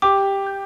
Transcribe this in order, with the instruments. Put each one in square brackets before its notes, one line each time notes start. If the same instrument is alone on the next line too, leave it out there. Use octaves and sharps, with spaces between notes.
[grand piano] G4 [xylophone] D6
[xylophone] G6